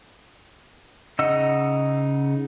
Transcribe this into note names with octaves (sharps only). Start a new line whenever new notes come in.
C#3 D#4 D#5 F#5 E6